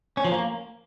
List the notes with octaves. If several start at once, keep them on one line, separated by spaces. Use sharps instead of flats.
C#4
F3
A#3